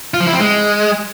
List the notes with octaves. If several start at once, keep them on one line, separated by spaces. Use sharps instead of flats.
F4
F3
E4
C4
G#3